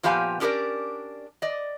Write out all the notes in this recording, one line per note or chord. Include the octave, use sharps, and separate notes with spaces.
A#2 F3 B3 G4 F5 G#5
C#4 D4 G4 G#4 A#4 D5
D5 D#5